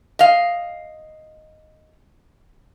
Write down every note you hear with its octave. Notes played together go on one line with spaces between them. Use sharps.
D#5 F5